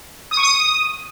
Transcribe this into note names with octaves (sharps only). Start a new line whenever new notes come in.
D#6
C#6
D#6